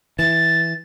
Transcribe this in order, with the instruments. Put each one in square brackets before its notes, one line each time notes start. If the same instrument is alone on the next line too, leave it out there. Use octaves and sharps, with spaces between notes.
[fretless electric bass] E3 [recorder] A6